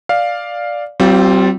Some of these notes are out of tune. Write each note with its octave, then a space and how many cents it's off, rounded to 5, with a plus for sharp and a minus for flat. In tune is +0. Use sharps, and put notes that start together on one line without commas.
D5 +0 F5 +5
G3 -40 C4 +0 F4 +0